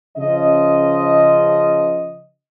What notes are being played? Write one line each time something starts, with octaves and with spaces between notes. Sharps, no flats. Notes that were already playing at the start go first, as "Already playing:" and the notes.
C#3 F3 D#5